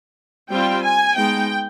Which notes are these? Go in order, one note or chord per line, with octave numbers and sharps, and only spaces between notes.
G3 C4 F4 G5
G#5
G#3 B3 D#4 G5